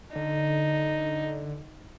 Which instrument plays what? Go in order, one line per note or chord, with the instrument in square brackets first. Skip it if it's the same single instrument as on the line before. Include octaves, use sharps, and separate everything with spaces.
[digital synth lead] D3 [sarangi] D#4